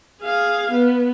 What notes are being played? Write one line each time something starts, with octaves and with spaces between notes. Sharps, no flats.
G#4 F5
B3